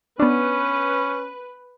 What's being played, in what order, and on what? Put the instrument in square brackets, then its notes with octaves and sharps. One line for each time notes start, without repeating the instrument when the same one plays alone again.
[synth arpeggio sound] B3 D4 [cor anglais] C#4 [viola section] B4